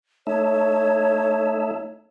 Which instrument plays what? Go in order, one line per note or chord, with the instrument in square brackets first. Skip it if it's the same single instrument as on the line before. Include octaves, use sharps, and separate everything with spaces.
[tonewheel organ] A3 D#4 E5 [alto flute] C#5